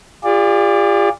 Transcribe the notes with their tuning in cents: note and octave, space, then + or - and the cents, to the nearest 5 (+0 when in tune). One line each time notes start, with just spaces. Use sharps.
F4 +0 G#4 -45 D5 +0